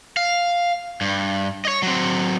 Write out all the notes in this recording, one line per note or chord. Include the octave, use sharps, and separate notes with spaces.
F5
G2
C#5 D#5
F#3 C4